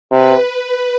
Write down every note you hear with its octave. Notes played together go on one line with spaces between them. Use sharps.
C3 B4